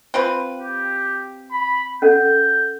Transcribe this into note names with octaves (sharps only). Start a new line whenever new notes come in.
C4 F4 B4
G4
B5
C#4 A4 F#5 G6